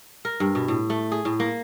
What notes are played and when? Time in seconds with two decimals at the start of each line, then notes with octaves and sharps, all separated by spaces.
0.25 A#4
0.40 G2
0.55 B2
0.68 A2
0.90 A3
1.12 G#4
1.25 A2
1.40 A#3